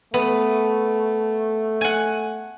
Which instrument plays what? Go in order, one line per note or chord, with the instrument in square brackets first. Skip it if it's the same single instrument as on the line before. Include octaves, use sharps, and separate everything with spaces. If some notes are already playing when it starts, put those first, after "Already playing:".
[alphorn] A3 [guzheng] B3
[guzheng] F#5 G#5